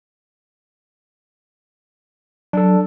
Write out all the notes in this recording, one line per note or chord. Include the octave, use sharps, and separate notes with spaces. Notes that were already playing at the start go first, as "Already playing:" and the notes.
F#3 D4 A4